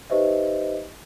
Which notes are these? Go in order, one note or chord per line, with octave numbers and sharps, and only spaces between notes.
D#4 G4 B4 C5 D#5 E5